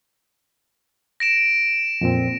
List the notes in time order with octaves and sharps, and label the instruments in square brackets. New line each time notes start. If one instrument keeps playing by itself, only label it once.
[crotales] A#6 D7 E7
[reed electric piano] F2 A#2 C4